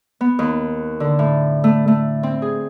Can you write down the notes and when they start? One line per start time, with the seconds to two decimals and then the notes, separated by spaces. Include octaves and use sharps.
0.21 B3
0.39 D#2
1.00 D3
1.19 A2
1.64 A3
1.88 A3
2.23 C4
2.42 G#4